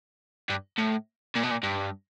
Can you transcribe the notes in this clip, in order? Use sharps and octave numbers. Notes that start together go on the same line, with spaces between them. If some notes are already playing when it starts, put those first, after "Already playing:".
G2
A2
A#2
B2
A#2
G2